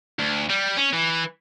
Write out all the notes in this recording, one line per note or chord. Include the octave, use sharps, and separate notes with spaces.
D2
G3
C#4
E3